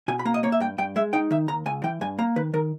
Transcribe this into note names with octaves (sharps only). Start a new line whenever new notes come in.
B2 G#5
B5
A#3 A#5
D#5
A#3 C#5
E5
G2 G5
G2 G5
G#3 E5
D#4 G5
D#3 E5
D#2 A#5
C#2 G#5
E3 G5
G2 G#5
A#3 A#5
D#3 B4
D#3 A#4